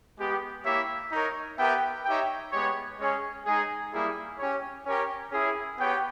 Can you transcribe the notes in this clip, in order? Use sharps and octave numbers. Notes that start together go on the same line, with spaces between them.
G#3 B3 G4
A#3 E4 G4 C#5 E5
D#4 A#4 C#5
B3 G4 A#4 E5 G5
D#4 G4 C#5 E5 G5
G#3 B3 G4 C#5
G#3 C#4 G#4 C#5
G#3 D#4 G#4
G3 A#3 E4 G#4
C#4 G4 C#5
C#4 G4 A#4 C#5
C#4 E4 G#4
B3 G4 C#5 G5